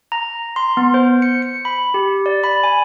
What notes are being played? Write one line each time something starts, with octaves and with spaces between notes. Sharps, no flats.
A#5
C6
B3
C5
C#7
C#7
B5
G4
D5
B5
G#5